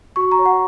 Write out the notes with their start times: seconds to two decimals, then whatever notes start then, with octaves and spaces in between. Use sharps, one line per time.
0.16 F#4 C#6
0.32 A#5
0.39 C#5
0.45 F#5